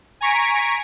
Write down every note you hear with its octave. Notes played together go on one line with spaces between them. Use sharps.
G#5 A#5 C#6 B6 D7